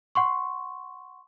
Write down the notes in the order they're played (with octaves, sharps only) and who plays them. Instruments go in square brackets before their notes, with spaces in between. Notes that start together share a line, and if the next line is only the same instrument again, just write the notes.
[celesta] F#5 C6 C#6